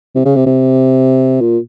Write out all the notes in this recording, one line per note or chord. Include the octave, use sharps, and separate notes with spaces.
C3
C#3
C3
C3
A#2